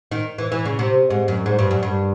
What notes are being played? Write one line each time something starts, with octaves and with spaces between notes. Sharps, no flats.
D#3
E3
E3
C#3
C3
G#2
F#2
G#2
G2
F#2
G2